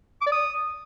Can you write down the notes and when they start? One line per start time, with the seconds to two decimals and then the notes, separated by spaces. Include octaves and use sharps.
0.21 D6
0.26 D5
0.32 D#6